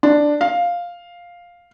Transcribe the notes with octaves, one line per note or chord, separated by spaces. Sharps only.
D4
F5